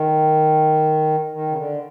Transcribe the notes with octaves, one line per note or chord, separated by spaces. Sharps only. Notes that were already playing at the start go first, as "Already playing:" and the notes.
Already playing: D#3
D#3
C#3
D3